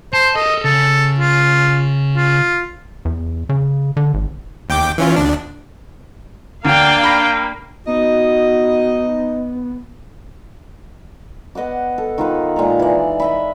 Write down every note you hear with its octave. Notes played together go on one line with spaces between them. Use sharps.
C5 A5
A4 A#4 D#5
C#3 A4
F4
F4
E2
C#3
D3
G#1
D#2 G5 D6
E3 C#4 F4
D2 D4
D2 A#3 D4 F5 G5
B5 A#6
B3 D#4 F#4 D#5
B3 D#5 F#5 D6
A4
D#3 F4 B4
A#2 G#3 A#5
E3 D5
D#5 E5 B5